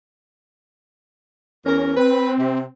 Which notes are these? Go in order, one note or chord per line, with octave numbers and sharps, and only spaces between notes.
E2 E3 C#4 A#4
C4 B4
C3